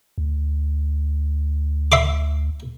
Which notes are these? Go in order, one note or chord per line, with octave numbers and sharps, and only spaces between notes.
D2
E5 C6 D6